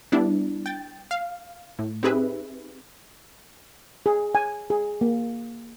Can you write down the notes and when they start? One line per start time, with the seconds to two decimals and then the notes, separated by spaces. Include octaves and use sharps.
0.12 G3 B3 D4 E4
0.66 G5 A6
1.11 F5
1.79 A2
2.03 C4 D#4 G4 G#4 B4 E5
4.06 G#4
4.35 G#5
4.70 G#4
5.01 A#3